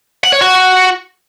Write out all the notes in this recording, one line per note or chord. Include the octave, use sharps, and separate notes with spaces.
F#5
C#5
F#4